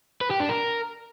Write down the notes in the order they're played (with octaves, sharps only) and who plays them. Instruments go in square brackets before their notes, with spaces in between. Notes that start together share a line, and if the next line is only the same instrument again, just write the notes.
[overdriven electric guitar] B4
G4
D4
A#4